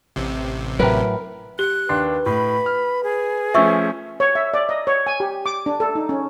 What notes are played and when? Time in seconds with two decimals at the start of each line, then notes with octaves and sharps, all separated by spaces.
0.16 A1 C3
0.79 A2 F#3 A#4 B4
1.59 G4 F#6 G7
1.89 D#2 D4 B4 C6
2.26 A2 B5
2.66 F6
3.04 G#4
3.54 F3 A3 C#4 E5 C#6 E6
4.20 C#5
4.35 E5
4.54 D5
4.69 D#5
4.87 C#5
5.07 G#5
5.20 G4
5.46 D6
5.66 D4
5.80 A4
5.95 D#4
6.09 C#4